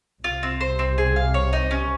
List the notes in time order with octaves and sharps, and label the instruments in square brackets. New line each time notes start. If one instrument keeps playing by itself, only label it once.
[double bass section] C2 C3 [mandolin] F4
[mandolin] C4
C5
C4
G#4
F5
C#5
D#4
C#4